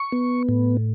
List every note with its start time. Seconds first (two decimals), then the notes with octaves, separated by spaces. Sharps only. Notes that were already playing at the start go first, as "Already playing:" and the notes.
Already playing: C#6
0.12 B3
0.49 A2